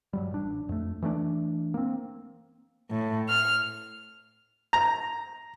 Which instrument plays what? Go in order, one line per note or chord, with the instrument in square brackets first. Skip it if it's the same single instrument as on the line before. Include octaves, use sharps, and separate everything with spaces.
[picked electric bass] G2 F#3 G3
A1 D4
F2 A3
E3 A3 B3 D4
A#3 C4
[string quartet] A2
F6
[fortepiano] A#5